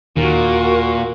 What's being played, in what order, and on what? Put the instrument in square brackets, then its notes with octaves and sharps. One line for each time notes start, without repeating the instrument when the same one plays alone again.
[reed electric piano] D#2 [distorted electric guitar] A#2 [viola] F#4 A#4